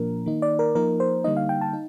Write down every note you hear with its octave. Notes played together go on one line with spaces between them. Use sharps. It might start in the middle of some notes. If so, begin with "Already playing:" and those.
Already playing: A#2 F3 A#3 D4 A#4
D#3 A#3 D#4
D5
A#4
F3 A#3 D#4 A#4
C5
D3 G3 A#3 D#4 D#5
F5
G5
A5
D#4